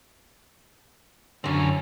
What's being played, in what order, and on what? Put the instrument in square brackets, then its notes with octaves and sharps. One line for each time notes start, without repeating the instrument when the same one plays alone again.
[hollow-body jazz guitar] F#2 D3 [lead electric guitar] C4 C#4